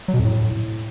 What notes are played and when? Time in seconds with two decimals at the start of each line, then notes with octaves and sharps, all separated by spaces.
0.08 F#3
0.14 B2
0.19 F2
0.25 A2